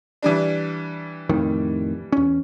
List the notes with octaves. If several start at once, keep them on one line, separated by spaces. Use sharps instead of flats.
E3 G3 D4
F2 A2 D#3
E2 C#4